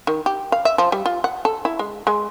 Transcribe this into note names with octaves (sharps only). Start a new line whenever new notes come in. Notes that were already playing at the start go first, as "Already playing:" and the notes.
D#3
G4
F5
E5
F3
G3
F4
F#5
A4
E4
G#3
G#3